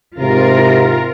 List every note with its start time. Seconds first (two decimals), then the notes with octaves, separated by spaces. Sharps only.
0.19 G#2 C3 F4 A#4